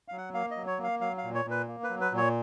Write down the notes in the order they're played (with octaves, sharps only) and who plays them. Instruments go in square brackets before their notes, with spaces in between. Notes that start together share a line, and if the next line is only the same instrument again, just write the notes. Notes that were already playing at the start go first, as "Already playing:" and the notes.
[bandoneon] F5
F#3
F#5
A#3 F5
D#5
F#3
C#5
A#3
F5
F#3 F5
F5
A#2
C#5
A#2
B4
A#3
B4
F#3
B4
A#2
C#5